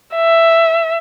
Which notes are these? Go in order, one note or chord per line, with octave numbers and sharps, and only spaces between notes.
E5